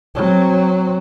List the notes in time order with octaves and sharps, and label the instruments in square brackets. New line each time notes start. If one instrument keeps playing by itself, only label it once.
[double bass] F#3 C4